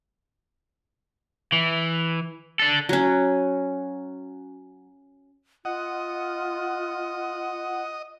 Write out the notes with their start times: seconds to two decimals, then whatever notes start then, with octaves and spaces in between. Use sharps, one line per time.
1.52 E3
2.60 D4 A4
2.89 F#3 C#4
5.65 F4 D#5 F#5